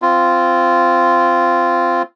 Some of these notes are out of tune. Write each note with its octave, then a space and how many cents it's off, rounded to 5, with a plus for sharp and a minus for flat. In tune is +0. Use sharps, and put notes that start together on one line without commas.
C4 -10 F4 -10